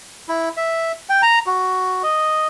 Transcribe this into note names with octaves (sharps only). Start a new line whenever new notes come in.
E4
E5
G5
A#5
F#4
D#5